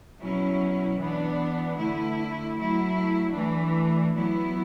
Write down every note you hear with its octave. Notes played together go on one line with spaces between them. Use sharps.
B2 F#3 C#4 E4
E3 B3 D4
D3 A3 E4
F#3 A3 E4
E3 A3 D4
F#3 B3 E4